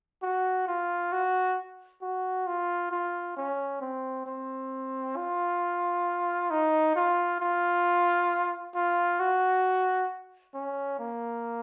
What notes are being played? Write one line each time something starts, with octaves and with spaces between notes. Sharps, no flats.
F#4
F4
F#4
F#4
F4
F4
C#4
C4
C4
F4
D#4
F4
F4
F4
F#4
C#4
A#3